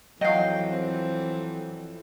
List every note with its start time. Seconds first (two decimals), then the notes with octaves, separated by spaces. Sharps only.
0.21 F2 E3 F#3 D#5 F5 G5
0.72 C4